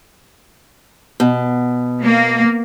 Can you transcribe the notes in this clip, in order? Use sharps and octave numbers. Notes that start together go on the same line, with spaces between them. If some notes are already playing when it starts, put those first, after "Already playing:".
B2
A#3